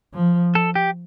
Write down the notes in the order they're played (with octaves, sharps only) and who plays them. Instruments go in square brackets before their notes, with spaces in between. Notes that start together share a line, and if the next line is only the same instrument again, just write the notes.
[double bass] F3
[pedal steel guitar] A4
G4